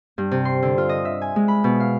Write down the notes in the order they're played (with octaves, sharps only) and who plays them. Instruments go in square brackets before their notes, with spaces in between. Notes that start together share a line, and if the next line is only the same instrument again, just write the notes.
[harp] G2
C3
C6
D3
F4
D#5
E5
G#5
G#3
B5
B2
F5